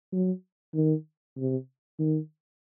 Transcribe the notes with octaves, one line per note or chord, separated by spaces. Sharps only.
F#3
D#3
C3
D#3